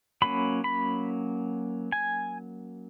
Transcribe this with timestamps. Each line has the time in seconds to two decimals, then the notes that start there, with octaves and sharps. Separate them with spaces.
0.22 F#3 A#3 C#4 B5
0.64 B5
1.92 G#5